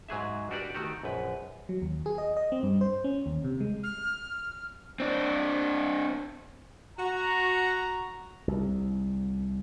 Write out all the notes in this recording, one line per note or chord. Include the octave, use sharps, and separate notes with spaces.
G#2 F#3 G#4 E5
D4 F#4 G4 A#4 B4 D5
D#3 A3 F#4 G4
A#1 F#2 B4
F#3
D#2
G#4
D#5
D#5
C4
G2
C5
C#4
D#2
C3
G#3
F6
C4 D4
F#4 A#5
C2